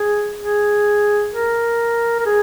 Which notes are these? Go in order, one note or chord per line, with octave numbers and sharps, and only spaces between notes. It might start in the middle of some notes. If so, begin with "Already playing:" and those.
Already playing: G#4
G#4
A#4
A#4
G#4